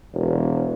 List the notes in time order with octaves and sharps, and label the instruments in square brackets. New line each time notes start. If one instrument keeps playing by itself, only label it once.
[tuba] E1